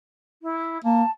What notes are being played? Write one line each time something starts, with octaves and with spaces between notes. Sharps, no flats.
E4
A#3 A5